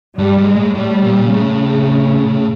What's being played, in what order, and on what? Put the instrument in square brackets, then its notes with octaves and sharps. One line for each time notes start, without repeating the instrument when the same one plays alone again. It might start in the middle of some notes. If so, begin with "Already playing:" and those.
[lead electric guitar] G2 [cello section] G3
[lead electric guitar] G#2
[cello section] G#3
[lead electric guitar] A2
[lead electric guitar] A2 [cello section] G3
[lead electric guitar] A#2
[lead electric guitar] A2 [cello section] C#3